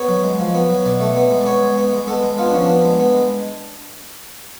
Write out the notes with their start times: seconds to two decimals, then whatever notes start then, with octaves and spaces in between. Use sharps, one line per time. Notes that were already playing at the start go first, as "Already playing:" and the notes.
Already playing: B3 C#5
0.08 F#3
0.23 G#3
0.39 F3
0.54 B3
0.69 F#3
0.86 B2 D5
1.00 A3
1.16 B3
1.31 G#3
1.41 D5
1.46 B3 C#5
1.62 G#3
1.78 B3
1.93 G#3
2.08 B3 A4
2.23 G#3
2.38 B3 F4
2.46 D4
2.54 F3 C#4
2.62 D4
2.69 B3
2.85 G#3
3.00 B3
3.15 G#3